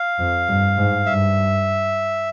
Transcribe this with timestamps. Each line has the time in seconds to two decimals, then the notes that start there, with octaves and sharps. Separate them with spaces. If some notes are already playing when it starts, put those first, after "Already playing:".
Already playing: F5
0.19 F2
0.49 G2
0.77 G#2
1.06 G2 E5